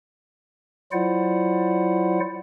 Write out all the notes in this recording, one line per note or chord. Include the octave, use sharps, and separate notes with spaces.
F#3 E4 F4 C5 D5 F#5